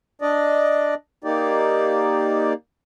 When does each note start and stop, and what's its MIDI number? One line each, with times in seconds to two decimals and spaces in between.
0.21 0.94 62
0.21 0.94 74
0.21 0.94 75
1.24 2.53 58
1.24 2.53 63
1.24 2.53 67
1.24 2.53 74